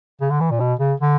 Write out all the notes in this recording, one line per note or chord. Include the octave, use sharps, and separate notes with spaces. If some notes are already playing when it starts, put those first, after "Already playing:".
C#3
D3
E3
A#2
B2
C#3
D3